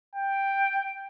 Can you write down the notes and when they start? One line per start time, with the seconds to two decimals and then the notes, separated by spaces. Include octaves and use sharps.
0.15 G5